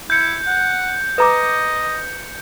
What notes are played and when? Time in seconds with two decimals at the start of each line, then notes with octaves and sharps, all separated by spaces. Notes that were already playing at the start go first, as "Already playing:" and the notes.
0.10 E4 G6 C#7
0.47 F#5
1.18 B4 D#5 A#5 D6